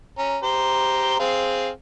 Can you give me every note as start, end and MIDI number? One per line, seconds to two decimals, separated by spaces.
0.18 0.38 61
0.18 0.38 82
0.43 1.19 67
0.43 1.19 72
0.43 1.19 82
1.19 1.69 60
1.19 1.69 68
1.19 1.69 77